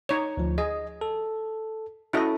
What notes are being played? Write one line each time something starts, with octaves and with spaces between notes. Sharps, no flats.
D#4 C#5
D2 F3
G#4 D#5
A4
C#4 E4 F#4 A4 D#5 A5